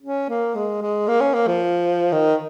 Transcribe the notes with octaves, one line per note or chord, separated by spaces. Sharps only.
C#4
A#3
G#3
G#3
A#3
C#4
A#3
F3
D#3